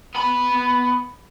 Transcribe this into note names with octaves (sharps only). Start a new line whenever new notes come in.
B3 B5